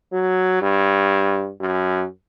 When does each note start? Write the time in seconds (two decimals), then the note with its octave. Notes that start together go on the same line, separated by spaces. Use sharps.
0.12 F#3
0.62 G2
1.60 F#2